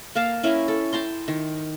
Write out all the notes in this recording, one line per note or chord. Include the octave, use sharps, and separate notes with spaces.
A#3 A#4 F5 A5
C#4 E4 A#4
A4
G5 A5 A#5 C6
D#3